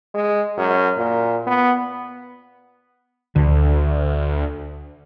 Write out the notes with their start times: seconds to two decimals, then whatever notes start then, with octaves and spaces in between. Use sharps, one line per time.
0.14 G#3
0.58 F#2
0.97 A#2
1.47 B3
3.36 D2 D3